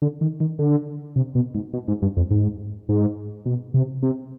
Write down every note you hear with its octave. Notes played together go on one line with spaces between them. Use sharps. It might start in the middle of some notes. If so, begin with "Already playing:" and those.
D3
D#3
D#3
D3
C3
B2
G#2
B2
G#2
G2
F2
G#2
G#2
B2
C3
C3